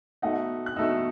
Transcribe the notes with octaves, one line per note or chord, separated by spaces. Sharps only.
B2 A3 D#4 F#5
F#6
B2 A3 D#4 E6